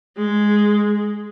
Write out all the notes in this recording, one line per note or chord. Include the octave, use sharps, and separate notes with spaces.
G#3